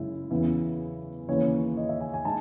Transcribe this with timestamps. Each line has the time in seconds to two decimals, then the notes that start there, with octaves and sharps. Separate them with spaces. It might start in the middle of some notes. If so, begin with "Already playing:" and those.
Already playing: F#2 C#3 G#3 E4
0.31 E2 C#3 E3 B3 E4
1.29 D#2 C#3 E3 C#5
1.77 D#5
1.89 E5
2.00 G#5
2.13 G#5
2.25 G#3 D#4 A5